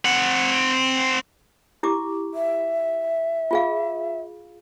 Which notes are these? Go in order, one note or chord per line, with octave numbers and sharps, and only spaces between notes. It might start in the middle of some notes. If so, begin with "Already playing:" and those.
C4 F#5
E4 G4 D6
E5
F4 G#4 F5